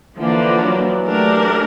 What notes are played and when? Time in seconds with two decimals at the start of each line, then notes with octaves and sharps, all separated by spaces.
0.18 D3 E3 F3 A#3 D4
0.62 E3 F#3
1.07 A3 D4 G4 A#4